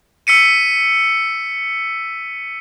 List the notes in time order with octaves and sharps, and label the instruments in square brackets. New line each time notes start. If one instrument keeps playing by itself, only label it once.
[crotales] E6 B6 C#7 D#7